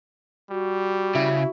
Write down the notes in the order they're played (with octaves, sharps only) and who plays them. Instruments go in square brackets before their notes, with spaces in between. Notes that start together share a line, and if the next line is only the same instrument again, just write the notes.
[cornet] G3 [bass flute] F#4
[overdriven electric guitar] C#3 [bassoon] E4